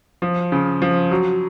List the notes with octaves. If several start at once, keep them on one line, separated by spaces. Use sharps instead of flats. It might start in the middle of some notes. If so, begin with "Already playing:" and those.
F3
C#3
F3
F#3